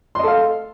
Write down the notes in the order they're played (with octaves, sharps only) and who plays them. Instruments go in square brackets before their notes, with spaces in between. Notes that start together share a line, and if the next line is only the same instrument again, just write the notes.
[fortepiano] C6
D#5
A4
F5